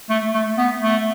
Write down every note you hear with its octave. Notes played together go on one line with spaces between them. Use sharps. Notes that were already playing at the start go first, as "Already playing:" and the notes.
A3
A3
B3
A3